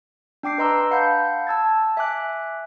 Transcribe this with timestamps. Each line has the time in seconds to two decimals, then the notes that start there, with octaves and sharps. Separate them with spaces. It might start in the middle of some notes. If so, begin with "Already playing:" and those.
0.43 D4 G5 D6 C7
0.58 B4 D#5 A#5 C6 E6
0.91 F5 F#5 A5 B5 G6
1.47 A5 E6 G#6 A6
1.97 E5 G#5 D6 F#6